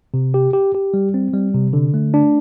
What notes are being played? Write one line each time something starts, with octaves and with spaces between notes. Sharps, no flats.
C3
G4
G4
G4
G3
C4
G3
C3
D3
A3
D4